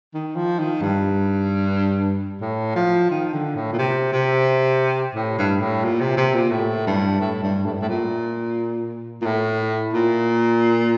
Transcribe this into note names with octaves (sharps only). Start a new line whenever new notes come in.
D#3
F3
D#3
G2
A2
F3
D#3
D3
A2
A#2
C3
C3
A2
G2
A2
A#2
C3
C3
A#2
A2
G2
A2
G2
A2
G2
A2
A#2
A#2
A2
A#2